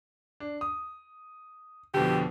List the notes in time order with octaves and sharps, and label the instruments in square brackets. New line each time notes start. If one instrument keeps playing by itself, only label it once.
[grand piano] D4
D#6
[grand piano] F2 B2 D3 [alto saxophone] G4